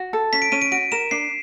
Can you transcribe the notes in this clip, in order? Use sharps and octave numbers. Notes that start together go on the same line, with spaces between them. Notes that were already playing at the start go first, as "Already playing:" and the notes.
Already playing: F#4
A4
C#4 B6
D7
C#4 D#7
D7
F#4 D7
A#4 E7
D4 C7